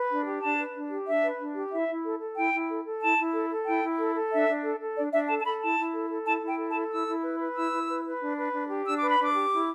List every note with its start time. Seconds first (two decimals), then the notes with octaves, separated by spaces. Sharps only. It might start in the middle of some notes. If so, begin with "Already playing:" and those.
Already playing: B4
0.09 D4
0.26 G4
0.42 D4 A5
0.58 B4
0.74 D4
0.90 G4
1.07 D4 E5
1.23 B4
1.39 D4
1.55 G4
1.72 E4 E5
1.88 E4
2.04 A4
2.20 A4
2.36 E4 G5
2.53 E4
2.70 A4
2.85 A4
3.01 E4 A5
3.18 E4
3.33 A4
3.50 A4
3.66 E4 G5
3.82 E4
3.99 A4
4.15 A4
4.31 D4 E5
4.47 D4
4.63 A4
4.80 A4
4.96 D4 D5
5.12 D4 E5
5.28 A4 A5
5.40 A5
5.44 A4 B5
5.61 E4 A5
5.77 E4
5.93 A4
6.09 A4
6.25 E4 A5
6.42 E4
6.47 G5
6.59 A4
6.69 A5
6.75 A4
6.90 E4 E6
7.07 E4
7.23 B4
7.40 B4
7.55 E4 E6
7.72 E4
7.88 B4
8.05 B4
8.20 D4
8.37 B4
8.52 D4
8.69 G4
8.85 D4 E6
8.97 B4 D6
9.09 B5
9.18 D4 D6
9.34 G4
9.51 E4